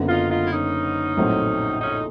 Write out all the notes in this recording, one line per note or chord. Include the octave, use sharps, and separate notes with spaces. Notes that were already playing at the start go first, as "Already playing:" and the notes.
Already playing: F#1 F#2 D3 F#3 B3
D#4 F4
D#4 F4
E4
C#4 D#4
A#1 A2 F#3 A3 C4
C#4 D#4